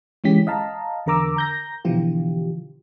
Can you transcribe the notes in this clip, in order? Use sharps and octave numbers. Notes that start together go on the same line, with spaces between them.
D2 E3 G#3 C#4 G4 B6
D#5 F5 A5 A#5
E2 D3 A#4 A#5 D6 E6
A#5 G6 A#6
B2 D3 E3 F3 F4 G4